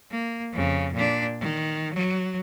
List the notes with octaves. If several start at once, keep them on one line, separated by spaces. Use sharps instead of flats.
A#3
F2 C#3
A#2 D4
D#3
F#3